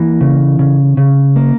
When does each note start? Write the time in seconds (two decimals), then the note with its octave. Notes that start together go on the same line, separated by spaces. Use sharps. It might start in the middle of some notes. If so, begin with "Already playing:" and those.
Already playing: E3 A#3
0.21 C#3
0.59 C#3
0.97 C#3
1.36 A#3